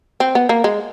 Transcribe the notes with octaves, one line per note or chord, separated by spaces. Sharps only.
C4
B3
A#3
G#3